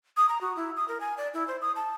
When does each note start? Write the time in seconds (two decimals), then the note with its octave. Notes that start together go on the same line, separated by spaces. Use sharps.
0.17 D#6
0.29 A#5
0.41 F#4
0.56 E4
0.76 D#6
0.88 A#4
1.01 G#5
1.18 D5
1.34 E4
1.48 C5
1.62 D#6
1.76 A5